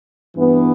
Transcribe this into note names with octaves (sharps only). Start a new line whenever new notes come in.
G2 E3 B3